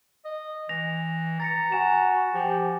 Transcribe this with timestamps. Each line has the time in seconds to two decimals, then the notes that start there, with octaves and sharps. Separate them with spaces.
0.25 D#5
0.69 E3 A#6 F7
1.40 A#5 A6 A#6 C#7
1.72 F#4 G#5 E7
2.34 F3 G4